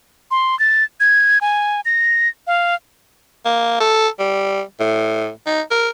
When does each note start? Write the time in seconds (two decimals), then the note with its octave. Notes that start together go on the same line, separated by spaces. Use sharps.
0.31 C6
0.60 A6
1.00 G#6
1.41 G#5
1.85 A#6
2.47 F5
3.45 A#3
3.80 A4
4.19 G3
4.80 A2
5.46 D#4
5.71 A#4